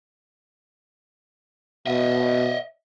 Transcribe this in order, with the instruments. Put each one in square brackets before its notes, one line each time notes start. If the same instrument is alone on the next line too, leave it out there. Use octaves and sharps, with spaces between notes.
[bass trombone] B2 [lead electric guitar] D#5 E5